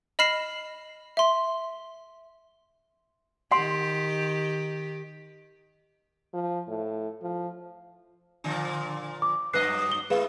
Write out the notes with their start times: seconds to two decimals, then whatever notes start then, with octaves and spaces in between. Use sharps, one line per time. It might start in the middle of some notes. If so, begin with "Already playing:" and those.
0.19 D#5 B5 F6 C7 E7
1.17 E5 C6
3.52 D#3 G4 F#5 C6
6.34 F3
6.69 A2
7.23 F3
8.44 A#2 D3 F3
9.22 D6
9.53 G2 F#3 B4 D#5 F#6 C7
9.92 G7
10.10 G#3 E4 G#4 B4 F5